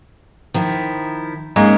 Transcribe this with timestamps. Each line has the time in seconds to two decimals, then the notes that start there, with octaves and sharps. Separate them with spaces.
0.54 D#3 F3 E4
1.56 G#2 A#3 C#4 A#4